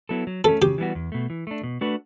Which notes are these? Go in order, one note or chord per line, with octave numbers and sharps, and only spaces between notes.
F#3 B3 E4 A4
F#3
A3 C#4 A4
C#3 G4
E3 G3 B3 F#4
E2
B2 A3
E3
A3 D4
B2
A3 D4 F#4 B4